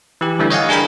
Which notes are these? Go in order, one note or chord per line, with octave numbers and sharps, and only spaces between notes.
E3 G4
D3 E3 G3 A3
C#5 D#5 F5 F#5 G#5
D4 G#4 A#4 G5 B5